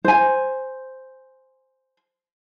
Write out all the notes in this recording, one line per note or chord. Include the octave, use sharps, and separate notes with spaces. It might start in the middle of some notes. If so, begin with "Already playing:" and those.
C5 G#5